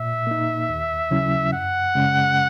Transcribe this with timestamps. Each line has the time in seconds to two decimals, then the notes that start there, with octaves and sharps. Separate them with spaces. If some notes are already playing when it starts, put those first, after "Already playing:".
Already playing: A#2 E5
0.27 A#3 D#4
0.69 D#2
1.11 C#3 F#3 C#4 E4
1.53 F#2 F#5
1.95 C#3 G#3 C#4